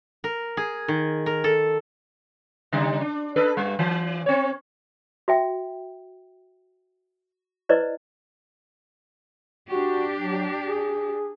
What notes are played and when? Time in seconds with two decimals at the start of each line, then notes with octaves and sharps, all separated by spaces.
0.24 A#4
0.57 G#4
0.88 D#3
1.26 A#4
1.44 A4
2.72 C#3 G3 D#4
3.01 D4
3.36 D4 A4 B4
3.57 G2 G3
3.79 E3
4.26 C4 C#5
5.28 F#4 E5 G5
7.69 E4 B4 C5 D5 D#5
9.71 D4 F#4 G4
10.17 F#3
10.67 G#4